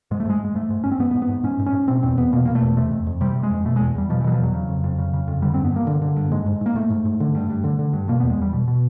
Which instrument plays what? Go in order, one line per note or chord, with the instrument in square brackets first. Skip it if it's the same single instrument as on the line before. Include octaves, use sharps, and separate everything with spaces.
[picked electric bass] G#2 G#3
A3
G#2 G#3
G#2 G#3
G#2 A3
G#2
G#2 C#4
C4
G#2 B3
B3
G#2
B3
G#2
G#2 C#4
G#2
C#4
G#2
B2 C4
E2 C4
E2 B3
B2 A#3
B2 A#3
A3
E2
C3 A3
F2
F2
C3 G3
C3
G#3
F2
B2 A3
E2 G#3
E2 G3
B2 F3
E3
B2 F#3
F3
E2 F#3
C#3
F2
F2
C#3
C#3
F2
D3 G3
G2 C4
B3
G2 A#3
D3
D3
G2
G#2 G#3
G#2
G#2 A#3
G#2 A3
G#2
G#2
D3
G2
G2
D3
D3
G2
B2 A#3
E2 B3
G#3
E2 G3
B2
B2